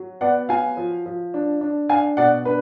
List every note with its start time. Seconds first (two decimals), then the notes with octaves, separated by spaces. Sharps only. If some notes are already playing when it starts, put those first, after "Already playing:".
Already playing: F#3
0.21 B3 D5 F#5
0.49 F#3 F5 G#5
0.77 F3
1.06 F3
1.34 D4
1.61 D4
1.89 D4 F5 G#5
2.17 B2 D5 F#5
2.45 D4 B4